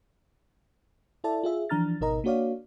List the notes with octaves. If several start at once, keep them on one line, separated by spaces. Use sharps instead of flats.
E4 A4 D5 E5 A5
F4 G#4 E5
E3 F3 D4 A#5 F6 A6
G#1 B2 D#4 A#4 D#5 A#5
A#3 D4 F#4 C#5 D5 F5